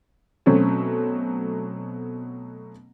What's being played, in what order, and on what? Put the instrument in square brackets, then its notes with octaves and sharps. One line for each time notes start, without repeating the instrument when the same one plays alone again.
[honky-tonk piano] B2 F#3 A3 C4 C#4